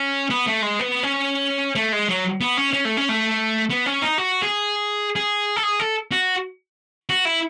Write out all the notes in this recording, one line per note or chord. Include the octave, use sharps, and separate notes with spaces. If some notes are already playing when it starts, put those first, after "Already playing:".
Already playing: C#4
B3
A3
G#3
B3
C#4
A3
G#3
F#3
B3
C#4
C#4
A3
C#4
A3
B3
C#4
D#4
F#4
G#4
G#4
A4
G#4
A4
F#4
F#4
E4